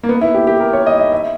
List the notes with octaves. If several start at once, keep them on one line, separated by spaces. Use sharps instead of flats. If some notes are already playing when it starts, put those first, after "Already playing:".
A#3
B3
E4
G4
G4
A#4
C#5
D#5
E5
E5